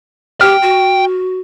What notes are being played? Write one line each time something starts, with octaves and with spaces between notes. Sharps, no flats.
G4 G5 F6
F#4